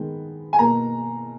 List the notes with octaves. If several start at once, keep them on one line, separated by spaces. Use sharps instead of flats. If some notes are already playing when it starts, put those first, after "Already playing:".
Already playing: D#3 G#3 B3
G#5
B2 A#3 A#5